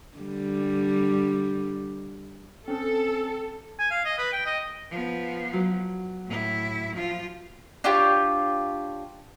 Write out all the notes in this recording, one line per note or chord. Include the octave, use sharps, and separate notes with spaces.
D3 G3
C4 C#4 A4
G#5
F5
D#5
B4
G5
D#5
F3 B3
F#3
A2 E4
F3 F4
D4 F4 G4 C#5